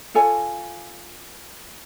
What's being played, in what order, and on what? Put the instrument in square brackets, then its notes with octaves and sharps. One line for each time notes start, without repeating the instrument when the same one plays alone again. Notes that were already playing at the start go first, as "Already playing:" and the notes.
[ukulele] F4 A4 C#5 G#5